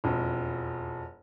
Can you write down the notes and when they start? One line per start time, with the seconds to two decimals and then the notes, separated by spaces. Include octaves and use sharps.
0.04 E1 F2